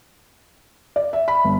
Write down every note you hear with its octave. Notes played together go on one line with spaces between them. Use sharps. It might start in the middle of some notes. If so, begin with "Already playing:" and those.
D5
E5
B5
G1